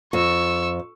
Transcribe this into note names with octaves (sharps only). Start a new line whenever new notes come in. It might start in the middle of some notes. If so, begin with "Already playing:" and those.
F2 C#6 E6